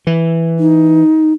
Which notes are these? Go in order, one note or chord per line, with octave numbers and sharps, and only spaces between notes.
E3
D#4